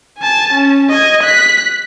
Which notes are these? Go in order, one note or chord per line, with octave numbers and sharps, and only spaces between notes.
G#5 A5
C#4
D#5 G#6
F#6 B6